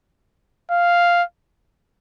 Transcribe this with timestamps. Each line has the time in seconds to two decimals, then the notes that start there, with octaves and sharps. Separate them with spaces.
0.71 F5